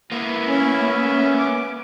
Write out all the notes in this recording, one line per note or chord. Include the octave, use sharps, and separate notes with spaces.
A#3 B3 E4
C#4
E5
D6